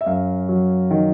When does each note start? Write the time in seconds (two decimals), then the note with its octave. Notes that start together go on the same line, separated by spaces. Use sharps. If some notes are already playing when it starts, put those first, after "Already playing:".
0.01 E5
0.06 F#2 F5
0.49 F#3
0.91 D#3